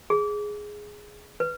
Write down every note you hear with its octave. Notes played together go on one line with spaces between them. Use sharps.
G#4
B4